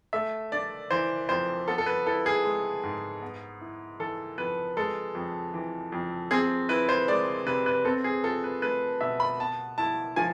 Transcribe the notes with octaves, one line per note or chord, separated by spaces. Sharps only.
A3 E5
D4 D5
E3 C5
F2 C5
B3 A4
A4
B4
E4 A4
G#4
G#3
G#2
B3
E4
E3 A4
F2 B4
G#3 A4
F2
E3
F2
C4 G#4
E4 B4
C5
G#3 D5
C3 B4
B4
C4 A4
G#4
F4 A4
B4
A3 B4
B2 E5
B5
B3 A5
E4 A5
F3 G#5